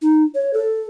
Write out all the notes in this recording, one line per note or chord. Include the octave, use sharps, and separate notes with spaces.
D#4
C#5
A4